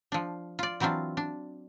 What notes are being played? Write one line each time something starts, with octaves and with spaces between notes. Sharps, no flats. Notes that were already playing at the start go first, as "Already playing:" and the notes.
F3 D4
F4 D5
E3 F#3 C4 D4 F4
D4